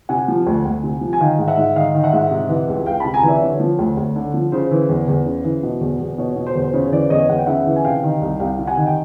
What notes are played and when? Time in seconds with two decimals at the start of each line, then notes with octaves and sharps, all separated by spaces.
0.09 C3 F#5 G#5
0.28 F3
0.47 D2
0.65 D2
0.83 C3
1.01 F3
1.13 G#5
1.20 D#3 F5 G5
1.39 G#2
1.47 E5 F#5
1.57 G#2
1.76 D#3 D#5 F5
1.95 D#3
2.04 E5 F#5
2.13 G#2
2.31 C3
2.49 E3
2.68 C#2
2.86 C#2 F5 G5
3.00 C3 A5 B5
3.14 G#5 A#5
3.23 E3 D5 E5
3.41 D3 C#5
3.60 F3
3.79 D2
3.97 D2
4.16 D3
4.34 F3
4.52 C#3 C5
4.71 E3
4.89 E2
5.08 E2
5.26 C#3
5.45 E3
5.63 B2
5.81 E2
6.00 E2
6.18 B2 C#5
6.36 B2
6.47 C5
6.55 E2
6.63 C5
6.74 C#3 C#5
6.92 E3 C5 D5
7.10 E2 C#5 D#5
7.29 E2 F#5
7.38 G5
7.46 C#3 E5 F#5
7.67 E3
7.76 G#5
7.85 C3 F5 G5
8.03 D#3
8.21 C2
8.39 C2 F5 G5
8.59 C3
8.67 F#5 G#5
8.77 D#3
8.86 G5